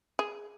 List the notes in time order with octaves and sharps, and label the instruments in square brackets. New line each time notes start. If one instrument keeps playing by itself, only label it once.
[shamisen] G#4